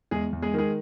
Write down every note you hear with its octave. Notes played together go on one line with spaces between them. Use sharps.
E2 G#3 G#4
E2
G#3 G#4
D#3 G#3 G#4